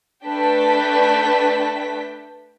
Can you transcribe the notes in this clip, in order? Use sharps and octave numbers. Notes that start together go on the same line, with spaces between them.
A3 D4 B4 G5 A5 B6